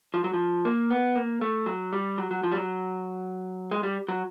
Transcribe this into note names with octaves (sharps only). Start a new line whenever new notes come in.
F3
F#3
F3
A#3
B3
A#3
A3
F#3
G3
F#3
F#3
F3
G3
F#3
G#3
G3
F#3